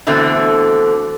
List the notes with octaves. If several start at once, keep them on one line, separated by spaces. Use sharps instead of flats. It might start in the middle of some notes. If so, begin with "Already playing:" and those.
B2 D3 E3 A3 C4